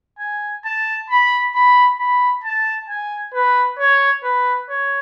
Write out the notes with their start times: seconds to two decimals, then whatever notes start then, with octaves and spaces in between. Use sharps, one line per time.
0.19 G#5
0.65 A5
1.10 B5
1.55 B5
1.99 B5
2.44 A5
2.89 G#5
3.34 B4
3.79 C#5
4.23 B4
4.69 C#5